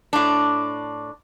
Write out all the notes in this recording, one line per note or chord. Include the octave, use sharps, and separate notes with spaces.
A2 D4